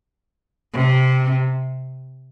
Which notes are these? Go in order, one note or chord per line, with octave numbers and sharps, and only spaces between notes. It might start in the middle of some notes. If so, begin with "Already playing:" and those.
C3